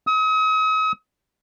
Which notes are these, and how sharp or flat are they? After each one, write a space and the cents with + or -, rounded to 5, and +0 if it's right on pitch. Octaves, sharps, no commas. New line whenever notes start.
D#6 +40